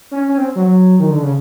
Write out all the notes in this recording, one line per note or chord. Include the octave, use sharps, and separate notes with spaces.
C#4
C#4
C4
F#3
D#3
D3
C#3